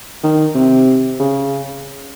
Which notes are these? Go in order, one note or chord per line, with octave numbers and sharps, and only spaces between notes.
D#3
C3
C#3